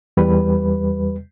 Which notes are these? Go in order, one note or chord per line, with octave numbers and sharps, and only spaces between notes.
E2 G3 B4